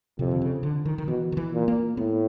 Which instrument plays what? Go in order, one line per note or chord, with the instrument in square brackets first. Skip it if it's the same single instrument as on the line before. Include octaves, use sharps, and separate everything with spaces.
[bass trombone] F2 [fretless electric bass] C3
[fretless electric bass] D3
C#3
D3
D#3
D#3
[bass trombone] B2 [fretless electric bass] E3
[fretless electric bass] D#3
E3
[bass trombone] A#2
[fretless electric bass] A#3
[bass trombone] A2 [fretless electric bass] B3